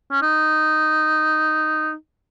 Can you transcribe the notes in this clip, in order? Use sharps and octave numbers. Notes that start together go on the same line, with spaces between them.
C#4
D#4